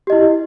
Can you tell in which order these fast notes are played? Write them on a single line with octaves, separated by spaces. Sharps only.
G4 D#5 E4